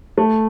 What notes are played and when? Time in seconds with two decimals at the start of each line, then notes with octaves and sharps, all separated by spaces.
0.18 A3